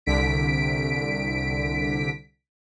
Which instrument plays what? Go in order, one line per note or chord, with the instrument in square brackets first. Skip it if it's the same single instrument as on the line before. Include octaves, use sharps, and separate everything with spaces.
[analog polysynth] C2 D3 B6 D7